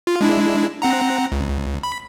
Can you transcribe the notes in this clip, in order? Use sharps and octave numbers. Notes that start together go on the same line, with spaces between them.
F4
G#3 D4 E4
C4 F#5 A#5
C#2
B5